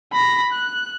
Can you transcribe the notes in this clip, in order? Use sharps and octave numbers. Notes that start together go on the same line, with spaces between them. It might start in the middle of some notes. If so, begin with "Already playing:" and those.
B5 A#6
F#6